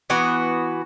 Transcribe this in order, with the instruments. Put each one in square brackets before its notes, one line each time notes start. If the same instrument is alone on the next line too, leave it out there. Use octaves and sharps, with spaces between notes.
[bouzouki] E3 B3 F#4 B4